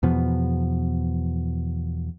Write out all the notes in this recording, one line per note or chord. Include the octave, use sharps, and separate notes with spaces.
E2 B2 F3 B3